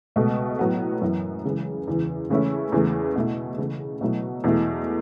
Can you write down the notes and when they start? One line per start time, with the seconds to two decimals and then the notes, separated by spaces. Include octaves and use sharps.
0.16 C#2 B2 A3
0.59 A2 F#3 B3
1.01 F#2 E3 B3 E4
1.45 C#2 C#3 E3
1.87 E2 C#3 E3
2.30 C#3 E3 A3 C#4 E4
2.72 E2 C#3 E3 A3
3.16 B2 A3 E4
3.58 C#3 E3 A3
4.01 B2 F#3 A3 E4
4.44 E2 B2 A3 E4